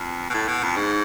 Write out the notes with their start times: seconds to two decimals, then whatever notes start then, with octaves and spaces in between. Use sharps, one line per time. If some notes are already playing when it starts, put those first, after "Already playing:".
Already playing: F2
0.30 B2
0.34 A2
0.48 B2
0.63 F2
0.77 G#2